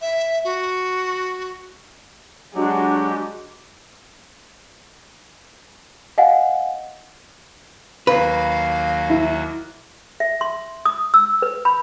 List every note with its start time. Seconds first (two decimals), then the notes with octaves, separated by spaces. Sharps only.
0.01 E5
0.44 F#4
2.55 F#3 G#3 D4 F#4 G4
6.18 D#5 F5 F#5 G#5
8.07 D#2 F#3 A#3 B4 F5
9.10 E4
10.20 E5
10.41 C6
10.86 D#6
11.14 E6
11.42 B4
11.65 B5